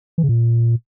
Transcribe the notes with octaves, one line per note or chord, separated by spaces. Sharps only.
E3
C#3
A#2